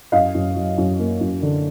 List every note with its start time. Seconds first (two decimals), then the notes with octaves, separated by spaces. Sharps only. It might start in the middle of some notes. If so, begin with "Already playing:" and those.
0.12 F#2 D#5 F5
0.34 F#2
0.56 F#3
0.78 F#2
0.99 A#3
1.20 F#2
1.43 D3